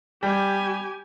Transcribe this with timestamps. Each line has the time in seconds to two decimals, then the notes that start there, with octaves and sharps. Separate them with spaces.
0.23 G3 G4 G#5